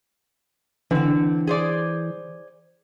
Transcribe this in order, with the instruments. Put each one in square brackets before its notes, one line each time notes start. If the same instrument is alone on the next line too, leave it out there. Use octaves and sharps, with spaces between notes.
[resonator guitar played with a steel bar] D3 C4 [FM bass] E3
[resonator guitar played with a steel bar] G#4 C5 D5